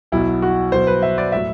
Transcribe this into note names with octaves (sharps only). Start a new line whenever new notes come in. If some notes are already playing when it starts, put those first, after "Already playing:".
B1 B2 F#3 E4
F#4
B1 B2 F#3 C5
B4
E5
D5
A2 F#3 E5